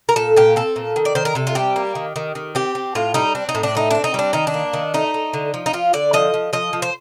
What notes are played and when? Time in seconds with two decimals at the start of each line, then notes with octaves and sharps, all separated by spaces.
0.09 A#4
0.16 A#2 A4
0.36 A#2 G4
0.56 C4 A4
0.76 A#2
0.96 D#3
1.05 D5
1.15 D#3 C5
1.25 A#4
1.35 C3 A4
1.47 F4
1.55 G3 G4
1.76 A#3
1.95 D#3
2.16 D#3
2.35 D#3
2.55 C4 G4
2.75 C4
2.95 A2 F4
3.14 G3 D#4
3.35 C4 D4
3.49 D#4
3.55 A2
3.63 D4
3.75 A3 D#4
3.91 C4 D4
4.04 D#4
4.14 G3 D4
4.33 D#3 D#4
4.47 D4
4.54 A#3
4.73 D#3
4.94 A3 D#4
5.14 A3
5.33 D3
5.54 F3
5.66 D#4
5.73 F3 F4
5.93 D3 D5
6.13 F3 D#5
6.34 F3
6.53 F3 D#5
6.73 F3
6.82 C5